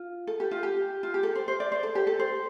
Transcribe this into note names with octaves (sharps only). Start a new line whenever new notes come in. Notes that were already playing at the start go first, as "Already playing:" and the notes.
Already playing: F4
A4
G4
F4
G4
F4
G4
A4
C5
C5
D5
C5
A4
G4
A4
C5